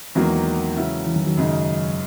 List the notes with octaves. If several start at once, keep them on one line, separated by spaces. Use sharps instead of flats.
E2 D#3 E3 F#3 G#3 A#3
C#3 F#3 C#4 E4
E3
D#3 F#3
D#3 F#3
F#2 C#3 G#3 D#4